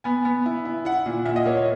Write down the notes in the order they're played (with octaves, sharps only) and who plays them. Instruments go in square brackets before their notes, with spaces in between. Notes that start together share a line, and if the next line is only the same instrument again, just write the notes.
[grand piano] B3 G#5
B3
E4
E4
E4 F#5
A#2
A#2 E5
D#5
A#3 C#5
C#5